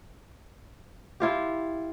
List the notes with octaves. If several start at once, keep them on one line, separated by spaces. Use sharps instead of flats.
E4 F4 G4